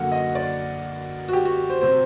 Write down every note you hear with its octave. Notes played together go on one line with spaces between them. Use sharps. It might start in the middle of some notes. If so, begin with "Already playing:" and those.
Already playing: F#2 D3 F#3 A#3 F#5
D#5
D5
F#4
G4
F#4
C5
C3 F#3 C4 C5